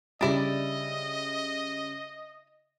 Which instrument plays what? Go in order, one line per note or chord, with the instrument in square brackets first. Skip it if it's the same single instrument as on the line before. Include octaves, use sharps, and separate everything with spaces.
[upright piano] C#3 G3 [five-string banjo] D4 E4 D5 [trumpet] D#5